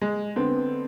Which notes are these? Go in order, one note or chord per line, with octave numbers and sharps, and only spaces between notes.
G#3
D3 B3 C4